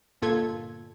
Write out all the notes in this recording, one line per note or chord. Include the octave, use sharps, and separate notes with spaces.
G1 A#2 F4 A4 G#6